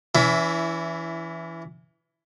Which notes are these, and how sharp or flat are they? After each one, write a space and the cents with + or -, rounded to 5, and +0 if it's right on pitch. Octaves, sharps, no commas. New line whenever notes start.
E3 +10 C#4 +45 E4 +0